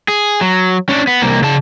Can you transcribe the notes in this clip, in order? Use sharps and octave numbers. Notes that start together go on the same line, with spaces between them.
G#4
F#3
C#4 D4
B3
C2 A#3
C#3 A5